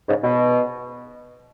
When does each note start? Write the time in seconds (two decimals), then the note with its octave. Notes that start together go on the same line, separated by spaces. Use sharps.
0.08 G#2 C#3
0.24 B2